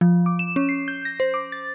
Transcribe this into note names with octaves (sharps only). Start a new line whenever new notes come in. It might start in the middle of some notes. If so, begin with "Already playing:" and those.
F3
D6
E7
C#4
C7
G6
A#6
C5
D6
A6